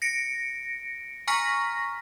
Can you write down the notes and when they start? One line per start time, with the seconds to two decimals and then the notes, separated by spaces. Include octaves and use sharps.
0.02 A#6 C#7 D7
1.28 G#5 A#5 C#6 F6 A#6 B6